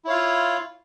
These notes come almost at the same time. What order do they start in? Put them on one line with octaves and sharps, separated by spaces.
E4 C#5 F5 F4